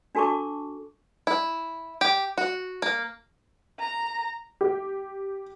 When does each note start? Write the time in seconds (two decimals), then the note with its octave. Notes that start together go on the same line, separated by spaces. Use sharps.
0.15 D4 F#4 A4 A5 C#6 D6
1.27 E4
2.01 G4
2.38 F#4
2.82 A#3
3.80 A#5
4.61 G4